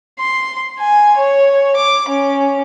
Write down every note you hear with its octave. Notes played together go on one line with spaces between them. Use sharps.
C6
G#5
C#5
D6
C#4